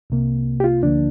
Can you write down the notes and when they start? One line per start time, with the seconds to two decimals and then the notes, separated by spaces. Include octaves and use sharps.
0.10 C2 C3 A#3
0.60 G4
0.64 F4
0.83 D2 D3 F3 A#3 D4